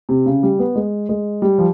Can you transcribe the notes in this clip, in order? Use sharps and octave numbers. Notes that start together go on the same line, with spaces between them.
C3
C#3
G3
B3
G#3
G#3
G3
F3